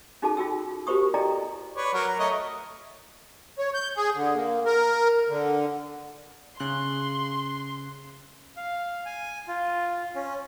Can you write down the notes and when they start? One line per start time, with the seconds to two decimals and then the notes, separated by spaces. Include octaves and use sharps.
0.22 C#4 D#4 F#4 G#4 A4 A5
0.37 F4 F#4 G5 E6
0.87 F#4 G4 A#4 C5 C#6 D#6
1.14 E4 A4 D5 D#5 G5 A#5
1.76 B4 C#5 D5
1.94 F#3 A#4
2.07 A#5
2.19 A3 C#5 D#5
3.58 C#5
3.74 G6
3.97 G#4
4.15 D3
4.35 A#3
4.66 A#4
5.29 D3
6.60 C#3 C6 F#6
8.57 F5
9.05 G#5
9.48 F4
10.15 C#4